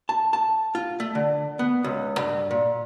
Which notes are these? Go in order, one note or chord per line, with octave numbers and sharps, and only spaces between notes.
A5
A5
F4
A3
D3
B3
C#2
G2
A#2